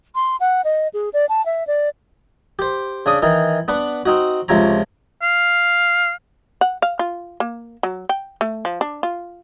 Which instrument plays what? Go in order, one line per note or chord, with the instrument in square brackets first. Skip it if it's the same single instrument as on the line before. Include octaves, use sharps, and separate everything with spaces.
[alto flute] C6
F#5
D#5
G#4
D5
A5
E5
D5
[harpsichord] G4 C5
C#3 D4 D#6
D#3 E3 D#4
B3 D4 B4 F#5
C4 D#4 F#4
C#2 C3 F3 C4 C#5 A#5
[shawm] F5
[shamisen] F#5
F5
F4
A#3
F#3
G5
A3
F3
D4
F4